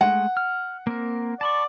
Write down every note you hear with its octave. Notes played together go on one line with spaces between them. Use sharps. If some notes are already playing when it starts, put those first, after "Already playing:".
G#3 A3 F#5
F6
A#3 C4 A#4
D5 A5 B5 C#6